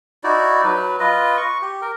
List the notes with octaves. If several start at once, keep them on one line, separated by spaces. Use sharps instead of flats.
D#4 E4 F#4 D5
F#3 B4
F4 B4 D#5
C#6
G4
A#4